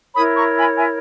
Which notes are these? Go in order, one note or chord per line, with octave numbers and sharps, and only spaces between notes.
E4 A#4 C#5 B5 D#6
A#5 C#6
G#5 B5
E5 G#5